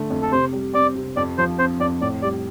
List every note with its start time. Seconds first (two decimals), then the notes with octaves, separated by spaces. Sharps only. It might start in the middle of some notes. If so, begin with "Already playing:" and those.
Already playing: D3 A3
0.10 F2
0.22 A4
0.32 C3 C5
0.53 G3
0.73 C4 D5
0.96 C3
1.16 F2 D5
1.38 F3 C5
1.58 C4 C5
1.80 F2 D5
2.01 A2 D5
2.22 G3 D5